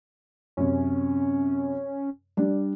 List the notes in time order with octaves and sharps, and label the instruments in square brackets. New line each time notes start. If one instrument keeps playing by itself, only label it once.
[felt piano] F#2 C3 [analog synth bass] C#4
[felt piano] G3 D4